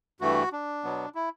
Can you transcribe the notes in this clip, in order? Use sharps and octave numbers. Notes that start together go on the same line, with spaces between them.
G2 E3 A3 F#4
D4
B2 F#3 B3
E4